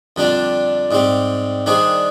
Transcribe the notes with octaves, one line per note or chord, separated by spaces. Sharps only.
F2 D3 G3 D4 G4
G#2 G3 C4 G4
D#3 G3 D4 G#4 C5